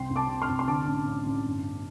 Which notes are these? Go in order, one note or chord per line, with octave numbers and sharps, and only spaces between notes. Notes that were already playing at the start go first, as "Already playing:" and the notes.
Already playing: C2 G5 C6
C2
A5 D6
C3
C6 F6
C2
C6
D3 A5 D6
A1
A1
A1
G1